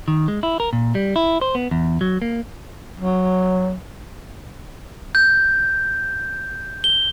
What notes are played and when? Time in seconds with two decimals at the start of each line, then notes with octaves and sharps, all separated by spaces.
0.08 D#3
0.28 G#3
0.43 E4
0.60 A#4
0.73 A#2
0.95 G3
1.16 E4
1.41 C5
1.55 B3
1.71 E2
2.01 F#3
2.22 A#3
3.00 F#3
5.15 G6
6.84 G7